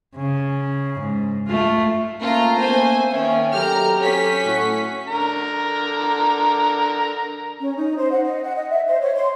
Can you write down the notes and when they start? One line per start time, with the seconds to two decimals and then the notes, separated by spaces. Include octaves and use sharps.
0.15 C#3
0.99 G#2
1.48 A3 F4
2.21 A3 A#3 C#4 F4 A#5
2.59 A#3 B3 C5 G#5
3.11 D#3 A#3 C#4 E5
3.53 F#3 G4 A4 A#5 F6
4.00 C#4 B6
4.45 A2 F#4
5.08 D3 A#4 A#5
7.61 C#4
7.77 D#4
7.97 C5
8.12 F#5
8.24 D#5
8.43 F#5
8.56 D#5
8.69 E5
8.87 C5
9.01 C#5
9.16 C6